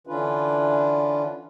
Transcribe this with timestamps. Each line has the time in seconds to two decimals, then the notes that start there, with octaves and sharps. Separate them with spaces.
0.07 D3 E3 C#4 D4 F4 B4